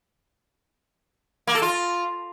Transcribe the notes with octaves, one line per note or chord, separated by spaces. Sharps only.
A#3
A4
F4